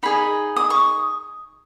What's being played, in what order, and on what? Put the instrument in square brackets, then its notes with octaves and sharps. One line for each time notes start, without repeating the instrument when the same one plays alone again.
[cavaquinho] D#4 G#4 D#5 B5
D#6
C#6